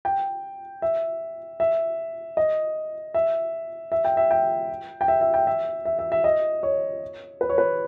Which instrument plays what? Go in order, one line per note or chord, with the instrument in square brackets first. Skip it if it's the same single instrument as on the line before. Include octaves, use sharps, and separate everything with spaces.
[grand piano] G5
E5
E5
D#5
E5
E5
G5
E5
G5
G5
E5
E5
G5
E5
E5
E5
E5
D#5
C#5
B4
C#5
B4